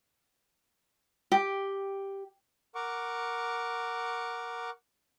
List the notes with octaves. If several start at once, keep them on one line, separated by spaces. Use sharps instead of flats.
G4
A#4 F#5 C#6 D6